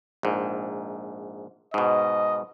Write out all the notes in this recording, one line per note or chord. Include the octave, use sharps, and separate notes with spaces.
A#1 G#2
G#2 B2 D#5